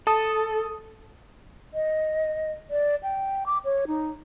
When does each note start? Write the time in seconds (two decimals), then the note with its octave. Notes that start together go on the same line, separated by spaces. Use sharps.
0.07 A4 A5 D#6
1.74 D#5
2.70 D5
3.03 G5
3.46 D6
3.65 C#5
3.87 D#4